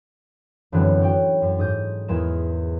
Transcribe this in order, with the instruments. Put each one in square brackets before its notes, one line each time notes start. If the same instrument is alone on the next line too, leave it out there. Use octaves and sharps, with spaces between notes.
[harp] G1 F#2 A2 E3 C4 F#6
F#4 C#5 G5
F#2
G#2 D#6 G6
E2 G#3 A#4 E7